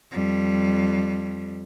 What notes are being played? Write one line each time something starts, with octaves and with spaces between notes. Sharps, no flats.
F2 G3